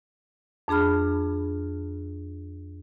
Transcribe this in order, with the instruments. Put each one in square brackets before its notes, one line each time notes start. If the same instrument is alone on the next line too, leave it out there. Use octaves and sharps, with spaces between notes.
[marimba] F2 D4 G#4 B5 F6